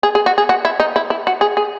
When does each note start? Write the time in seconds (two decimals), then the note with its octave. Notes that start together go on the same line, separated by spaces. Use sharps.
0.03 G#4
0.15 G#4
0.26 F#4
0.38 G#4
0.49 F#4
0.65 E4
0.80 D#4
0.96 E4
1.10 E4
1.27 F#4
1.41 G#4
1.57 G#4